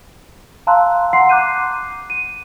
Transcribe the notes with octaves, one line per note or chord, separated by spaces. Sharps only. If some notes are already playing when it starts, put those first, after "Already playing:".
F5 A5 A#5 C6 E6 F#6
F#5 A#5 C6 C7
D6 F#6 G6 D#7
D#7